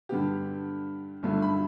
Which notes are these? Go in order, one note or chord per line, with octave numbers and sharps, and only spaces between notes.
G2 D3 B3 G4
G1 G2 D3 A3
B5